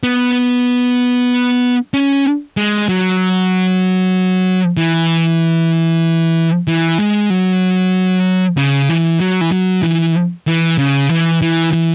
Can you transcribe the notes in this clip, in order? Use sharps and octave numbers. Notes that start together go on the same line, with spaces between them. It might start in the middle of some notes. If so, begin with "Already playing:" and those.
B3
C#4
G#3
F#3
E3
E3
G#3
F#3
C#3
E3
F#3
E3
F#3
E3
E3
C#3
E3
E3
E3